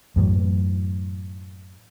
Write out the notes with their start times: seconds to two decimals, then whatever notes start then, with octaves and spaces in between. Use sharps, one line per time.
0.16 F#2 A2 E3